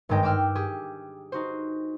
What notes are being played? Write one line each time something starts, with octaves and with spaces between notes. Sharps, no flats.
G#1 G2 D#3 G#3 G5 A#6
G5 D6 E6 F6
G4 G#4
D#4 F#4 C5